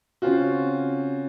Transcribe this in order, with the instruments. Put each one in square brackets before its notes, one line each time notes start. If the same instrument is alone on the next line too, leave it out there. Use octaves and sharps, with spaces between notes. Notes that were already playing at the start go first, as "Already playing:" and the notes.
[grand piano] C#3 C4 C#4 F4 F#4